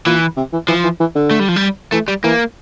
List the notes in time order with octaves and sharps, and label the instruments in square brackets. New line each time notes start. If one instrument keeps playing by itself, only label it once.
[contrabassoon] A#2 [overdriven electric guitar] E3
[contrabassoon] C3
E3
[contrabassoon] E3 [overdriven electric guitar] F3
[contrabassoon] E3
E3
D3
[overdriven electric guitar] A3
G3
F3
G3
[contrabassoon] E3 [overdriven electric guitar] A3
[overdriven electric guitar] G3
[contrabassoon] E3 [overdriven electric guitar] A#3